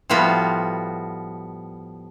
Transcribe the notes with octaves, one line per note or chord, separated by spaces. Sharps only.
A2 F3 G3 B3 F4 F#4